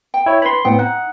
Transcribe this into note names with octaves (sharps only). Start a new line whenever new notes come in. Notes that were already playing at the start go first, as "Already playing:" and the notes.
G5
E4 C#5
D4 B4 C#5 B5 C6
A2 B3 C4 F#5 G5
D#4 F#5